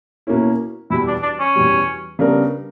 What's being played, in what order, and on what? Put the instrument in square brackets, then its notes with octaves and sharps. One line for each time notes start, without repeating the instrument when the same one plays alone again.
[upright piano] B2 A#3 C#4 E4
[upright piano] E2 B2 G3 [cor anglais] E4
[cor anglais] D4
D4
C#4
[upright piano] E2 B2 G3
C#3 G3 B3 D4 A#4